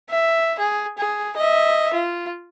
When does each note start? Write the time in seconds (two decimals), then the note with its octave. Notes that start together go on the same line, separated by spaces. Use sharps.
0.10 E5
0.59 G#4
0.98 G#4
1.36 D#5 E5
1.93 F4